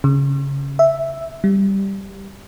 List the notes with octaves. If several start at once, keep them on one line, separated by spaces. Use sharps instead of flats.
C#3
E5
G3